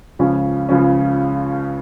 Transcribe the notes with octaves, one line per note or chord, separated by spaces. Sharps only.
C#2 C#3 F3 C#4
C#2 C#3 F3 C#4